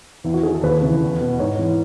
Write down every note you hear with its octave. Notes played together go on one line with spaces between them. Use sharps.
E2 E4
F#4
D#3 G#4
A4
D#2 B4
C#3 E3
E2
B2
G#2 C#5
E3